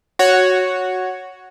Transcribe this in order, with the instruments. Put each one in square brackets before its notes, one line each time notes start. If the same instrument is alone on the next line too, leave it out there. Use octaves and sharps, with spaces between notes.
[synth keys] F#4 C#5